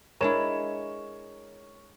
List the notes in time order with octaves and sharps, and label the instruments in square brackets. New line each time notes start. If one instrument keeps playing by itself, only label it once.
[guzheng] G#3 D4 E4 [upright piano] A#4 C#5 E7